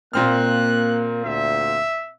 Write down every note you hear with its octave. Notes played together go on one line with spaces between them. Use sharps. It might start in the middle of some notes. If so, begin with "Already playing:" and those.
A#2 A#3 C4 F6 F#6
D2 E5